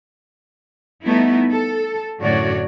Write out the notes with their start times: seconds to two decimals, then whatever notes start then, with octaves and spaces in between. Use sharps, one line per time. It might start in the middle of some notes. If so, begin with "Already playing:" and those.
1.04 G3 A3 B3 D#4 E4
1.51 A4
2.21 F#2 A2 D3 F#4 C#5 D5